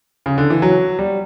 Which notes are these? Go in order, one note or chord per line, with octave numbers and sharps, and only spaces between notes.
C#3
D3
E3
F#3
G3